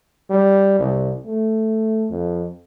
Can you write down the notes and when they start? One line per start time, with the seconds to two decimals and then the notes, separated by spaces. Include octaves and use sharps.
0.30 G3
0.79 C2
1.25 A3
2.10 F2